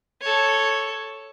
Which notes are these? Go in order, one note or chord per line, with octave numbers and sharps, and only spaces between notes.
A4 C#5